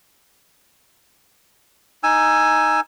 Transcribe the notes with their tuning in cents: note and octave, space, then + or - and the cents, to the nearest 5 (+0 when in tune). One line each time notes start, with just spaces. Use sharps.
D#4 +5 G#5 +0 E6 +15